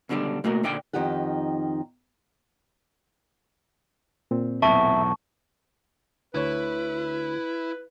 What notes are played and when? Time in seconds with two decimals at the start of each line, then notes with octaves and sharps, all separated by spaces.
0.09 C#2 B2 D3 G3 D4
0.44 B2 A3 A#3 F#4 A#4
0.63 A#2 D3 D5 G5
0.93 F2 D#3 D#4 G4 F#5
4.31 A#2 C4
4.62 B1 E2 A2 E5 A5 C#6
6.35 D2 E4 B4 C#5